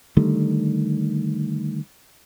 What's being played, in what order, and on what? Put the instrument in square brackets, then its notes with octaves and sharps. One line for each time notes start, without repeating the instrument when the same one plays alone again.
[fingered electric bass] D3 D#3 G3 A3